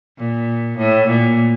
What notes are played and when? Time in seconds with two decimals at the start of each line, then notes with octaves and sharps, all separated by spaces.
0.18 A#2
0.77 A2
1.07 A#2